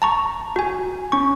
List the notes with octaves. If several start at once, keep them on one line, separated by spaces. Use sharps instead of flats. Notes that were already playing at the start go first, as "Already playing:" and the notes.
A5 A#5 C#6
F#4 G#5
C#4 C#6